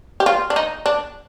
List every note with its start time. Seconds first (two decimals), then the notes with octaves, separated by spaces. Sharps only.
0.20 G4
0.26 F4
0.50 D4
0.56 D#4
0.86 D4